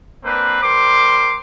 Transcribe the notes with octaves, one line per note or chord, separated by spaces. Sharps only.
A#3 C4 D4 B4
G3 A#4 C5 C6 D6